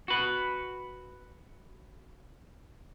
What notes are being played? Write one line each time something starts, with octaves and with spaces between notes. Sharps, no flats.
F#4 B4